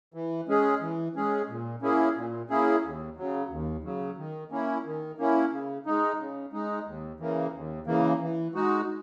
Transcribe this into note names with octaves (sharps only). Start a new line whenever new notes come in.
E3
G#3 C#4 G#4
E3
G#3 C#4 G#4
A#2
A#3 C#4 E4 G#4
A#2
A#3 C#4 E4 G#4
D#2
C#3 F#3
D#2
C#3 F#3
D#3
A#3 C#4 E4
D#3
A#3 C#4 E4
C#3
G#3 D#4
C#3
G#3 D#4
D#2
C#3 E3 A#3
D#2
C#3 E3 A#3
E3
G#3 D#4 F#4